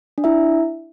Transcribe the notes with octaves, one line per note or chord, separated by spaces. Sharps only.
D4
E4 E5